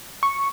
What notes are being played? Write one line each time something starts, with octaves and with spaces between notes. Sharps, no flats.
C#6